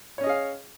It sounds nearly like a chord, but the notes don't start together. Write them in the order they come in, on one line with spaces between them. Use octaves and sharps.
C#5 C#4 D#5 G#4 F5